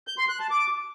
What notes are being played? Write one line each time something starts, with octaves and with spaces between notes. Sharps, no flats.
G6
C6
F#6
A5
D6